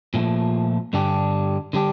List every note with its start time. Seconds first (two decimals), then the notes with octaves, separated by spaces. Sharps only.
0.14 A#2 F3 A3
0.93 G2 D3 G3 D4 G4
1.73 D3 G3 D4 G4